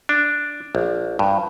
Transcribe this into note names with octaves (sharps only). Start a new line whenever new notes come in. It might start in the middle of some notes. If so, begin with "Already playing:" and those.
D4
A#1
G2